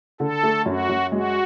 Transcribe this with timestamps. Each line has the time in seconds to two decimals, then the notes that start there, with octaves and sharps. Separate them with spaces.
0.20 D3 A4
0.43 A3
0.65 F#2 F#4
0.89 F#2
1.11 G#3 F#4